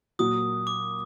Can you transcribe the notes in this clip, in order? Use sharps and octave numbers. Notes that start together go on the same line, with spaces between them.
A#2 F#3 A#3 F#4 D#6
D6